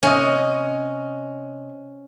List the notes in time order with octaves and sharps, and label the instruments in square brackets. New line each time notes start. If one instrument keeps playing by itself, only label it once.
[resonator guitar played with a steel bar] C3 D#5 [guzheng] C#4